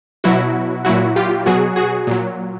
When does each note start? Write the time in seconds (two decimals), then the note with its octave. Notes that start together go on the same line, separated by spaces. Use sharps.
0.24 B2 F#3 E4 F#4
0.85 A#2 F#3 E4 F#4
1.16 F4 G4
1.46 B2 F#3 F#4 G#4
1.76 F#4 G#4
2.07 A#2 F#3